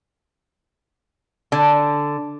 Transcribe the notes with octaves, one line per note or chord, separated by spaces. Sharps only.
D3